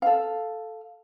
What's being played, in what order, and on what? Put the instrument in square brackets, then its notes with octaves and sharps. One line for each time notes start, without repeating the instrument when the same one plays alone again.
[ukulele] A4 F5